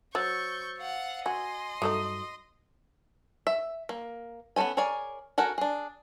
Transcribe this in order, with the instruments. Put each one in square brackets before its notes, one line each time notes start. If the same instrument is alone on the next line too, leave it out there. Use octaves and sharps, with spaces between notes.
[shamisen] F#3 [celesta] C5 E6 A6 [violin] C#6 G6
[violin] F5 F#5
[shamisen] F#4 [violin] D#5 C6 [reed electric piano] G#5
[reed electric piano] G2 [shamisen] F#3 A3 D#4 [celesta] D#6
[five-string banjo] E5
A#3
B3 C#4 A4 C5 G#5
G#4 A#4 C#5 D5 G#5
F#4 A4 A#4 F#5 G#5
D4 G#4